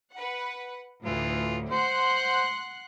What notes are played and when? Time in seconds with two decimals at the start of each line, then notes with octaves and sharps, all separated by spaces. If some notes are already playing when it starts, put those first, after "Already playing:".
0.15 B4 F#5
1.05 D2 A2 E3 F4
1.71 C5 F#5 C6 F#6